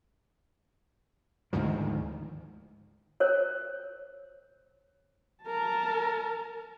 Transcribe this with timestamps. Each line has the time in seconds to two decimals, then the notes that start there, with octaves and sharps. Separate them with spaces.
1.53 D2 G#2 D#3 F3
3.20 A#4 C5 C#5
5.44 A#4 A5